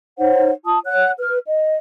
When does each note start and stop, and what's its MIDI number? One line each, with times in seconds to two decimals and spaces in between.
0.18 0.50 63
0.18 0.50 72
0.18 0.50 73
0.18 0.50 78
0.65 0.78 65
0.65 0.78 81
0.65 0.78 87
0.86 1.11 73
0.86 1.11 78
0.86 1.11 90
1.18 1.37 71
1.18 1.37 89
1.47 1.78 75